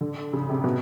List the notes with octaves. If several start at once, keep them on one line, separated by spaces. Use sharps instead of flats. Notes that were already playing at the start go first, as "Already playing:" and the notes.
D3
C#3
C3
B2